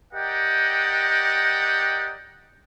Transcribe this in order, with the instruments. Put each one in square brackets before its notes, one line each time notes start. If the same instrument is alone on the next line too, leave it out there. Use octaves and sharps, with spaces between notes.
[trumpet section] G4 A#4 D5 D#5 F#5 G5